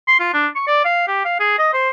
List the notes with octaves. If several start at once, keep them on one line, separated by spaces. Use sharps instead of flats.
C6
F4
D4
C#6
D5
F5
G4
F5
G#4
D#5
C5